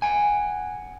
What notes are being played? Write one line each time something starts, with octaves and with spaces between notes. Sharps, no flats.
F#5 G#5